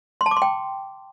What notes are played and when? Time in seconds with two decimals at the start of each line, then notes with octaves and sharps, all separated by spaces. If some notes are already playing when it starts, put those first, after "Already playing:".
0.21 C6
0.26 A5
0.31 D6
0.37 C6
0.42 G5